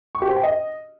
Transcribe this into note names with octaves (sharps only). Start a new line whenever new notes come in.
C#6
G4
C5
G5
D#5